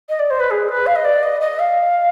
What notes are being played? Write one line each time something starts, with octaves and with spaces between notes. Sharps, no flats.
D#5
D5
C5
B4
G#4
B4
F5
D#5
D5
D#5
D#5
F5